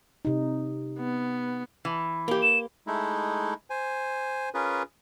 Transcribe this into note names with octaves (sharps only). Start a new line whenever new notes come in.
C3 D#4
B3
E3
A#3 G4
E7
G#3 A3 D#4 E4
C5 G#5
C#4 F4 G#4 A#4 B4